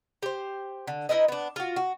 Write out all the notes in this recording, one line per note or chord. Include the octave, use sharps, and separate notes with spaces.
G4 C5
D3
D#4 E4 B4 D#5
B3 D4
F4 F#4
F#4